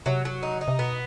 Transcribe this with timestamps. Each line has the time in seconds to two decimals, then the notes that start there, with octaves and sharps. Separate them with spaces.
0.06 C3 F#3
0.25 F#3
0.43 D#4
0.57 C#3 D#4
0.68 C3
0.79 B2 B3